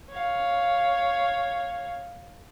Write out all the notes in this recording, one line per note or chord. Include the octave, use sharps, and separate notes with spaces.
C#5 F5